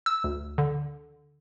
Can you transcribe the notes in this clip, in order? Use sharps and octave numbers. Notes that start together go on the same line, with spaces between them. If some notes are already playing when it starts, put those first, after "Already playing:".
E6
D2
D3